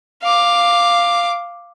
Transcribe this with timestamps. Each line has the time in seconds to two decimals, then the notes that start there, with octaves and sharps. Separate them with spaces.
0.22 F5 D6